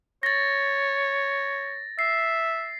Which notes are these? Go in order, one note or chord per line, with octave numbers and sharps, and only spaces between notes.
C#5 A6 A#6
E5 C7